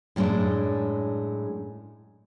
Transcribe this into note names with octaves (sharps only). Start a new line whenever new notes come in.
F#2 A2 G#3 A3 D4